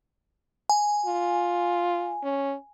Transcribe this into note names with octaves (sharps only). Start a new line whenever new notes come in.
G#5
F4
C#4